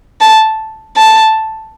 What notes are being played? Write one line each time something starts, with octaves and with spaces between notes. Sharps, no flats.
A5
A5